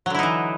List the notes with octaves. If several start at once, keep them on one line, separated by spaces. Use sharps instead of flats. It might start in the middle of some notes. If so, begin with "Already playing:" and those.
D3 E3 F#3 D#4 E4